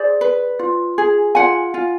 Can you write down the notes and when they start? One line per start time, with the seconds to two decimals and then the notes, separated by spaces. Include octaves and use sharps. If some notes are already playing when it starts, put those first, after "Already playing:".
Already playing: G#4 C5 D5
0.21 B4
0.59 F4
0.98 G#4
1.35 F4 F#5 G#5
1.74 F4